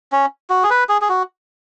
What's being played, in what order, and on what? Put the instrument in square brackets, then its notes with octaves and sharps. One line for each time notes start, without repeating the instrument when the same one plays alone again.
[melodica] C#4
F#4
G#4
B4
G#4
G#4
F#4